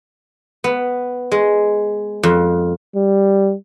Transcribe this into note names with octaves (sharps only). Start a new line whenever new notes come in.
B3
G#3
F2
G3